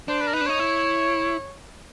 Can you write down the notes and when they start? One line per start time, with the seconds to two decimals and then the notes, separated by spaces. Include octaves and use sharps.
0.08 D4 C5
0.21 B4
0.27 A#4
0.33 D#4 B4
0.41 D4
0.46 D#4 C#5
0.59 E4